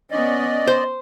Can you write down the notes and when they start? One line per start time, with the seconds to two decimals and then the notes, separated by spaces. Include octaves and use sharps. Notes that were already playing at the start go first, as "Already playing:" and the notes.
0.11 B3 C#4 D5 D#5
0.68 C5